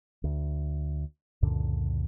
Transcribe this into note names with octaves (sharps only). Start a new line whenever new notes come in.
D2
C#2 F#2 A#2 D3